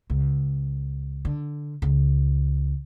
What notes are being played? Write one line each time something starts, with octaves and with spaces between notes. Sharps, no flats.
C#2
D3
C#2